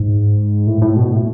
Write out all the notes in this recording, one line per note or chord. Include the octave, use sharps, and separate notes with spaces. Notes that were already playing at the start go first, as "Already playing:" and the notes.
Already playing: G#2
A2
A2
B2
A2